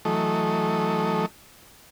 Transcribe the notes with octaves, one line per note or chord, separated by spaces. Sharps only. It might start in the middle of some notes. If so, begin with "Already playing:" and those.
E3 F#3 A3 A4 D#5